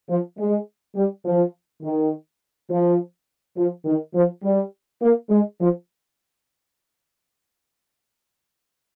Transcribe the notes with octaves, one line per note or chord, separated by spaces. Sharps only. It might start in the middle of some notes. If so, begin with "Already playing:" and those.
F3
G#3
G3
F3
D#3
F3
F3
D#3
F3
G3
A#3
G#3
F3